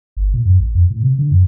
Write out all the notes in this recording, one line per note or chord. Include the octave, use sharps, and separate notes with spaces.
G1
A#2
F#2
A#1
F2
A2
C3
D3
F#2